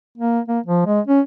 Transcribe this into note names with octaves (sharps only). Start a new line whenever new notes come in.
A#3
A#3
F3
G#3
C#4